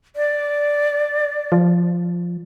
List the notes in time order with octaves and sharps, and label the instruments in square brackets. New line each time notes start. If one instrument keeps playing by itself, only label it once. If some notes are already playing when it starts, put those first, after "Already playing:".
[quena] D5
[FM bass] F3